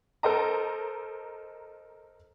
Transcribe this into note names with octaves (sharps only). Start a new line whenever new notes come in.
A4 A#4 C5 D#5 A#5